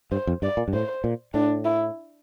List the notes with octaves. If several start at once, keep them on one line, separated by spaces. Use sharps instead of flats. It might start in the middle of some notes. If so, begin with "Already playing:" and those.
G2 C5
F2
G2 D5
A#2
G2
A2 C5
A#2
A2 D4
E4